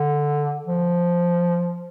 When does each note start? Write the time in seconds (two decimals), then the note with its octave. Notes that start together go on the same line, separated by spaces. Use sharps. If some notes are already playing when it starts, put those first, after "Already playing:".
Already playing: D3
0.66 F3